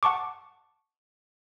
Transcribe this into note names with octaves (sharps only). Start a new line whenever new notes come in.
F#5 A5 C#6 D6